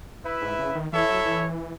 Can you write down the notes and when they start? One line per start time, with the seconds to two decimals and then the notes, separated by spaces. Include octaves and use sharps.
0.24 E4 B4 E5
0.42 G#2
0.59 C#3
0.75 D#3
0.93 E3 E4 A4 C#5 E5
1.09 F#3
1.25 E3